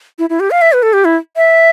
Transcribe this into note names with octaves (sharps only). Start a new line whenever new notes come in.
E4
E4
G4
F5
E5
B4
A4
G4
E4
E5